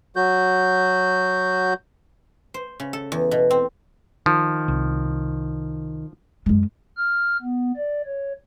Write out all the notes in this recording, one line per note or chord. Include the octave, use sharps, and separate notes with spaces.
F#3 F#4 G6
C5
C#3
A4
E2
B2
C4
D#3 F3
C2
F#2 G#3
F6
B3
D5
C#5